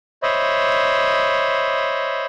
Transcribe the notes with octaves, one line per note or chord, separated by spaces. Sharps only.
C5 C#5 D#5 E5 B5